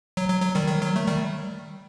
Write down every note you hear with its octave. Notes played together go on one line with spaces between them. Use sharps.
F#3
F#3
F#3
D#3 G3
D#3
F#3
A3
D#3 G3